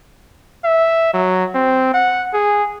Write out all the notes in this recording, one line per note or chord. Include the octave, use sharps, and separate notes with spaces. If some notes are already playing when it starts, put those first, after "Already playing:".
E5
F#3
C4
F#5
G#4